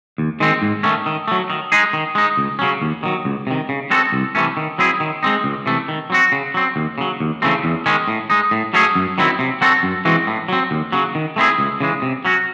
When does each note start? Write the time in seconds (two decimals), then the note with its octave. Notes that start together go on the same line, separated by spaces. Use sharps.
0.18 D#2
0.40 D#3 G#3 C4
0.62 G#2
0.83 D#3 A3 C#4
1.06 D#3
1.28 F#3 A3
1.50 D#3
1.72 G#3 D#4 G#4
1.93 D#3
2.15 G#3 D#4
2.37 C#2
2.59 C#3 F#3 C#4
2.82 D#2
3.03 D#3 F#3
3.25 C#2
3.47 C3 D#3
3.69 C#3
3.90 G#3 C4 F#4 A4
4.12 C2
4.35 C3 E3 A3 C#4
4.57 D#3
4.78 F#3 C4 E4 G#4
5.00 D#3
5.23 G#3 C4 D#4
5.44 C#2
5.66 C3 E3 A3
5.88 D#3
6.10 F#3 C4 F#4
6.32 C#3
6.54 F#3 C4
6.76 D#2
6.98 C#3 F#3
7.20 D#2
7.42 C#3 E3 A3 C4
7.64 E2
7.86 D#3 G#3 C#4
8.08 A2
8.30 G#3 D#4
8.51 A2
8.74 F#3 A3 C#4 G#4
8.95 F#2
9.18 D#3 F#3 C4 E4
9.39 C3
9.61 F#3 C4 F#4 A4
9.83 F#2
10.05 E3 G#3 C4 F#4
10.27 A2
10.48 F#3 C4
10.71 D#2
10.92 C#3 F#3
11.15 D#3
11.36 A3 C4 E4 G#4
11.58 C#2
11.80 C#3 E3 G#3
12.02 C3
12.25 F#3 C#4 F#4